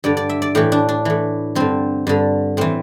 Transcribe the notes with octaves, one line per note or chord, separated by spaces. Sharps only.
G2 D3 D5
D5
E5
D5
A2 E3 G4
D4
D4
A2 E3
G2 D3 C4
G2 D3
A2 E3 C4